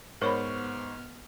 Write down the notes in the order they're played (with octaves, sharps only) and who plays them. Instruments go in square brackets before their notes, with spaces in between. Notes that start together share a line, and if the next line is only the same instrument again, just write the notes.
[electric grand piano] G#2 C5 C#6 [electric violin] B3 F6 [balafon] A#4 C#5 B5